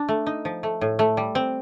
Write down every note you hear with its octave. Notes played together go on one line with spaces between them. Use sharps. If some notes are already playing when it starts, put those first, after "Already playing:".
Already playing: D4
A3
D#4
F3
A3
A2
A3
G3
C4